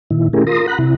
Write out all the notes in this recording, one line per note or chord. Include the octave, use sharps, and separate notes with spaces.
A#2 D#3 E4
A3 C#4 E4 G4 G#4 A#4
F4 A#4 C6 D#6 A#6
F#5 A#5 B5 F#6
C3 E4